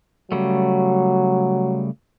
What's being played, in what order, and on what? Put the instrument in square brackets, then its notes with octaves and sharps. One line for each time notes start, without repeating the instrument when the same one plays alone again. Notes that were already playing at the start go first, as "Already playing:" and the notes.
[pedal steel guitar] C#3 G3 A3 [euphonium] F#3